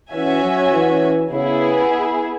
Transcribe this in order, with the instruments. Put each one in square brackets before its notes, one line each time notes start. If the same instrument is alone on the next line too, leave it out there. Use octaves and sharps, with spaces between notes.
[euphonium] E3 [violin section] C#4 F#4 E5 G#5
[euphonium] F#3
E3
[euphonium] C#3 [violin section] B3 E4 G#4